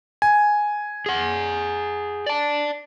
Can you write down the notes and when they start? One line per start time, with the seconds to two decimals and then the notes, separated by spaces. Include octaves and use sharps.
0.22 G#5
1.06 G#4 F#5
2.26 D5 A5